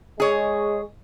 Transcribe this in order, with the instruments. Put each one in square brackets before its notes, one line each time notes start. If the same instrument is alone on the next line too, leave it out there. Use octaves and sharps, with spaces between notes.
[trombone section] G#3 [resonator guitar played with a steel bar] G#4 C#5